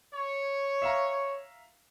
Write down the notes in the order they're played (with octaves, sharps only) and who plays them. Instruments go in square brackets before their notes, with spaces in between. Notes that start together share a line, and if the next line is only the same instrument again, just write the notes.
[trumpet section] C#5
[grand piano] E5 F5 A#5